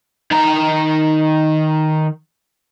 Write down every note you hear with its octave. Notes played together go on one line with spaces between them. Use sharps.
D#3 A#5